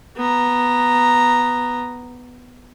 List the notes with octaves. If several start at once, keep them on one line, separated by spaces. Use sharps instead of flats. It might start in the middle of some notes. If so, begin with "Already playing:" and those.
B3 A#5